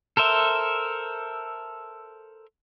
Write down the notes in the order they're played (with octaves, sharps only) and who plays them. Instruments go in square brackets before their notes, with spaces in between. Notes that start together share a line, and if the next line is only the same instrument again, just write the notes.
[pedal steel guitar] A4 A#4 C5 E5